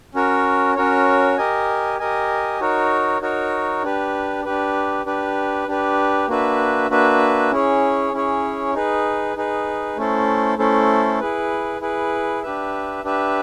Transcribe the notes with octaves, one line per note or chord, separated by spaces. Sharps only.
C#4 F#4 A#4 C#5
C#4 F#4 A#4 C#5
G4 A#4 D#5 G#5
G4 A#4 D#5 G#5
D#4 F#4 A#4 C#5
D#4 F#4 A#4 C#5
D4 G4 B4
D4 G4 B4
D4 G4 B4
D4 G4 B4
A#3 D4 F#4 B4 E5
A#3 D4 F#4 B4 E5
C#4 E4 G#4 C#5
C#4 E4 G#4 C#5
D#4 G#4 B4
D#4 G#4 B4
A3 C#4 E4 A4 C5
A3 C#4 E4 A4 C5
E4 G#4 B4
E4 G#4 B4
D4 G4 B4 E5
D4 G4 B4 E5